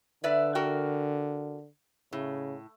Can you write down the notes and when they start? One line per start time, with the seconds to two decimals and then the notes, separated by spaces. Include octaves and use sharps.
0.24 D3 B4 D5 E5
0.55 F#4 A#4 G5
2.13 A2 C#3